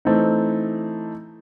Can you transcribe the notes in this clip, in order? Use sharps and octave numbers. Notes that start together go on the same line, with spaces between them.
E3 A3 C4 D#4